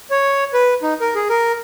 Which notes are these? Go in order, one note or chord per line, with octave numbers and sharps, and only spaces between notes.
C#5
B4
D#4
A#4
G#4
A#4